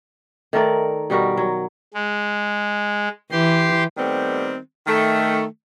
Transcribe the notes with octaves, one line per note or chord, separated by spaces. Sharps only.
D#3 A3 A#4 D5
B2 G3 F#4 A#4
F#3
G#3
E3 G4 C6
D#3 G3 A3 B3 C4
D#3 A3